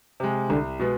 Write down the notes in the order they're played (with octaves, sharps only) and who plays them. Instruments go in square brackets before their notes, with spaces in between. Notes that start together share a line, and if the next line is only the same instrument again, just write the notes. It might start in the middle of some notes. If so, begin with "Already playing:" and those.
[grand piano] C3 G#3
[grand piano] C2 [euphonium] D3
[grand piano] B2 G#3 B3